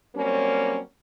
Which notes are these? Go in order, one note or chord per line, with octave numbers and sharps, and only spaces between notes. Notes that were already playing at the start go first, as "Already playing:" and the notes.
F#3 G3 A#3 C4 C#4